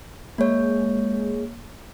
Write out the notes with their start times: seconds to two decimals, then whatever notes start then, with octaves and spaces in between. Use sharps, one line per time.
0.38 G#3 A#3 C#5